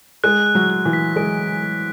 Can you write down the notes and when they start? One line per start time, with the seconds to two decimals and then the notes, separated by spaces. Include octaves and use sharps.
0.24 G#3 F#6
0.46 F#6
0.55 F#3
0.70 F#6
0.85 E3
0.93 B6
1.16 G#3 D7